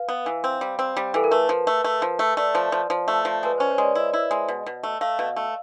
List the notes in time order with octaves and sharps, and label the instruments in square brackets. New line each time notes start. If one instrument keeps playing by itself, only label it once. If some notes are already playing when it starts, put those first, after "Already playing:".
Already playing: [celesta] B4 F5
[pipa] B3
E3
C4
G3
C4
G3
[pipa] E3 [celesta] A4
[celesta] A#4
[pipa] A3 [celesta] B4
[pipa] F3
A3
A3
F3
A3
[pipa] A3 [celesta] D5
[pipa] F3
F3
F3
A3
F3
[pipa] G#3 [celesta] B4
[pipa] C#4 [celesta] C5
[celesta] C#5
[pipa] G#3 [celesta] D5
[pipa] E4 [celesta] D#5
[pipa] E4
G#3
B2
B2
A3
[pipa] A3 [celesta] F5
[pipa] B2
A3